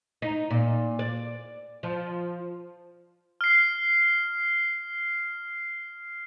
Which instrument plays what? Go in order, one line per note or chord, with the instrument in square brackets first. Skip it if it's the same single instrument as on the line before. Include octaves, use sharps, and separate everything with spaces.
[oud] D#4
A#2
D5
F3
[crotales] F6 C7